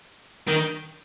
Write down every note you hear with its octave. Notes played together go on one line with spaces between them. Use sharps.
D#3